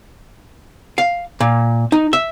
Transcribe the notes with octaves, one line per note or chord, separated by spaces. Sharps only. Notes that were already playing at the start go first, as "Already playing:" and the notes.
F5
A#2
D#4
E5